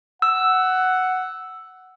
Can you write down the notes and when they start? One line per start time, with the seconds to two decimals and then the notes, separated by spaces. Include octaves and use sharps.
0.22 F#5 E6